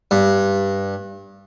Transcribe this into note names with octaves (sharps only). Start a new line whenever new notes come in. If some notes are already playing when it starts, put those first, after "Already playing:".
G2